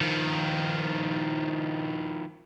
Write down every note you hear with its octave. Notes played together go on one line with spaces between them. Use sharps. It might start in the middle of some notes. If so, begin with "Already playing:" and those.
D#3 F3